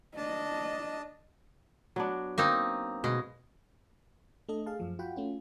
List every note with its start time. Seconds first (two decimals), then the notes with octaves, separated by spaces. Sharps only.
0.17 D4 D#5 A5
1.96 F#3 B3 D4
2.38 A#3 C4 D#4
3.04 B2 G#3
4.49 A3 D4 A4 D#5
4.66 G#4 F5 A5
4.80 F#2 F3
4.99 F4 F#4 F#5 G5 B5
5.16 A3 C#4 F4